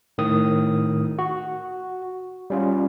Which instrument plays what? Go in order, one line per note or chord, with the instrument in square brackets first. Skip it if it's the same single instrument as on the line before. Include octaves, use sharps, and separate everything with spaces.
[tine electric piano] A2 D#3 D#6
F#4
G3 C#4 F4